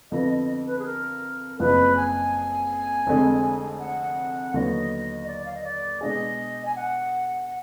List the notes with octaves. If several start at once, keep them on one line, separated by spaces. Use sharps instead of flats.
F2 D3 F3 B3 D#5
D#5
B4
G#4
A#4
F#1 F2 F3 B3 B4
G#5
F1 F2 D3 G#3
F#5
D#2 D3 F#3 B3 D#5
D5
F5
D#5
D5
B2 G#3 D4 G#4 D#5
G#5
F#5